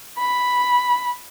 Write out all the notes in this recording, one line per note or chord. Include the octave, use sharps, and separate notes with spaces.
B5